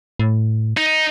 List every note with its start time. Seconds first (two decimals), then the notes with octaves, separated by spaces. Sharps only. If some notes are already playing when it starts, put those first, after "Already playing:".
0.19 A2
0.77 D#4